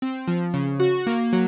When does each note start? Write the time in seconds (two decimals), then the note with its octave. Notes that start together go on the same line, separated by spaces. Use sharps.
0.02 C4
0.28 F3
0.54 C#3
0.80 F#4
1.07 A#3
1.33 F#3